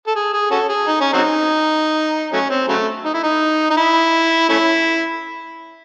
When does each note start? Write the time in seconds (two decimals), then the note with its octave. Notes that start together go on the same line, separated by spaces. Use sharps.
0.07 A4
0.16 G#4
0.33 G#4
0.51 C#4 F#4 A4
0.69 G#4
0.88 D#4
1.01 C#4
1.14 F#3 C4 D#4
2.33 F#3 A3 C#4
2.50 C4
2.68 C#3 F#3 A3
3.05 D#4
3.14 E4
3.23 D#4
3.70 D#4
3.77 E4
4.49 A3 C#4 E4